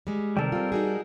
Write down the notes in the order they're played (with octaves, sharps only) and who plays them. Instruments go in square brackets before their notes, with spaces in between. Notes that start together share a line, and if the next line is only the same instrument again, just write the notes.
[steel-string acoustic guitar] G3 G#3
[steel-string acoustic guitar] C3 D#3 [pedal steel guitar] G3 A4 A#4
[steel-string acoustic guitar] C4 F4
D#4 F#4 G#4